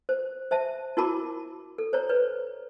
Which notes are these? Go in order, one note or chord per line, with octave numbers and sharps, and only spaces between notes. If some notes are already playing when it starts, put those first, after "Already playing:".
C5
C5 E5 A5
E4 F#4 A#4 A5 B5 D6
A4
C5 C#5 A#5
B4 C#5